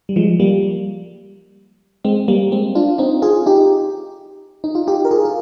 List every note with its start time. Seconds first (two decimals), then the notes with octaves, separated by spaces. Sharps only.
0.09 G3
0.16 F3 G#3
0.40 G3 A#3
2.04 G#3 C4
2.28 G3 A#3
2.51 G#3 C4
2.75 D4 F4
2.98 C4 D#4
3.22 F4 G#4
3.46 D#4 G4
4.64 D#4
4.75 F4
4.87 D#4 G4
5.05 A#4
5.11 F4 G#4
5.25 F4